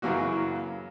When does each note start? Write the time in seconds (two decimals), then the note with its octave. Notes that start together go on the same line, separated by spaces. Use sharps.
0.02 F#2 C#3 E3 F#3 A#3 F#4